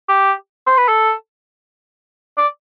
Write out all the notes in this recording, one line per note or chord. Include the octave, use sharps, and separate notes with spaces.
G4
C5
B4
A4
D5